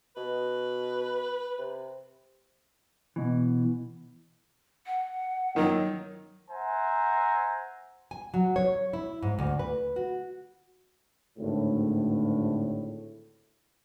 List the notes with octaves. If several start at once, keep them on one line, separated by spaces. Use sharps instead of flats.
B2 B4
C3
B2 E3
F#5
D#3 F#3
C5 E5 F#5 G#5 A#5
G#5
F#3
C#5
E4
G#2
D2
B4
F#4
G#1 D2 A2